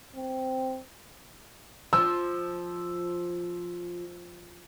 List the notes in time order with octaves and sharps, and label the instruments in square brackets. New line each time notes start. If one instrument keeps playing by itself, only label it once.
[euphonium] C4
[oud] F3 [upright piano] E6